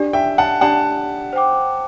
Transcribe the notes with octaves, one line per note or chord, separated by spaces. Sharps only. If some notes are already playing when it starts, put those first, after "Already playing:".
Already playing: D4 G4 D5
E5 G5
F#5 A5
D4 G4 D5 F#5 A5
C5 G5 D6